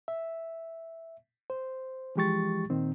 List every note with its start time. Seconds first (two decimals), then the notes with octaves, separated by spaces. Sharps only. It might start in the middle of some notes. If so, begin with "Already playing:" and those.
0.08 E5
1.50 C5
2.16 E3 F3 G#3 G4 C#6 A6
2.70 A#2 D#3 C4